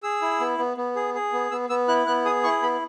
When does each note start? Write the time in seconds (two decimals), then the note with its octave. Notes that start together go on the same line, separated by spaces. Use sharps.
0.03 G#4 E6
0.22 E4
0.40 B3
0.58 B3
0.77 B3
0.96 G#4
1.14 G#4
1.33 B3
1.51 B3 E6
1.69 B3 E6
1.88 E4 F#6
2.07 B3 F#6
2.25 G#4 D#6
2.44 E4 C#6
2.62 B3 B5